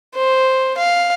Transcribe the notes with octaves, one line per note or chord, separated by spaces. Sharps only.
C5
F5